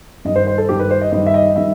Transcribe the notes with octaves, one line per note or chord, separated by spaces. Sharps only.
G2 D#3 G3 D#5
C5
C5
A4
G2 D#3 G3 G4
B4
C5
D#5
G2 D#3 G3 D#5
E5
D#5
D#3 G3 E5